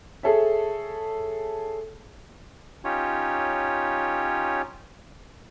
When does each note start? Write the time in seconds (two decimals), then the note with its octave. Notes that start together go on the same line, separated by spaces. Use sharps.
0.23 G#4 A4 C#5 E5
2.84 C#4 D#4 F4 G4 C#5